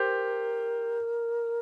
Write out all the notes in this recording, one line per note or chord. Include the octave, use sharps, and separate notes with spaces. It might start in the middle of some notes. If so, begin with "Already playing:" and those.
Already playing: G4 A#4 C5